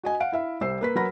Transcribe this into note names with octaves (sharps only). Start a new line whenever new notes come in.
F#4 D#5 G#5
F5 F#5 D7
E4 E5 F5
C2 G3 C5 E6 C7
A#3 B4 B6
F#3 A#4 B4 F#5 B5 A#6